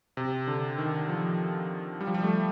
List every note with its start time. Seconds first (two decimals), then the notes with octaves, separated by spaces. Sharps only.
0.17 C3
0.47 D3
0.78 D#3
1.09 F3
2.01 G3
2.07 F3
2.14 G3
2.23 A3